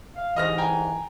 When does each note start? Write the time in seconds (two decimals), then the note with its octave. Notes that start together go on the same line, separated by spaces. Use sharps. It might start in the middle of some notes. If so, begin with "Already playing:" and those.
0.16 F5
0.36 C2 G#2 E3 D#5 F6 A#6
0.58 G5 G#5 A#5